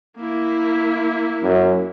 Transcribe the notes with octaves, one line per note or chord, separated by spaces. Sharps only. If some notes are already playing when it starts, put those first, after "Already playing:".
A#3 E4
F#2